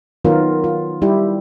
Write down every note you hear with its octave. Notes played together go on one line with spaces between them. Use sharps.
D#3 F#3 B3 F4 A#4
F4
G3 E4 G4